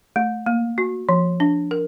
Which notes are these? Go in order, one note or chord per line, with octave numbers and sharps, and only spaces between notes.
A3
A#3
F#4
F3
D4
A#4